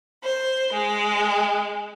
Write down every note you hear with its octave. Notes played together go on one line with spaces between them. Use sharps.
C5
G#3